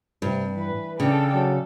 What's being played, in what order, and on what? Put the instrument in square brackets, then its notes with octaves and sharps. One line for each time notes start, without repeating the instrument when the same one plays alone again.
[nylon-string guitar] G2 [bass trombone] C3
[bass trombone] E3 [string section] B4
[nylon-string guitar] C#3 [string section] D4 A4 G5
[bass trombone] F#3 [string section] A4